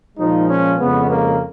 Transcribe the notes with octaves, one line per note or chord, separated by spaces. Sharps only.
A#2 F3 G#3 D#4
C#4
F2 C#3 G#3 B3
A#3